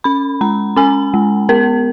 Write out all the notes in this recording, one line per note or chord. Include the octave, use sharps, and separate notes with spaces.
C#4 B5
G#3 A#5
C#4 G#5
G#3
B3 A#4